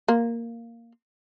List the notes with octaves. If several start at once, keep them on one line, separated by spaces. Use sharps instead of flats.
A#3